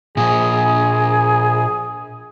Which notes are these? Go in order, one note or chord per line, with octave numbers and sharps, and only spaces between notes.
A#2 F3 G#4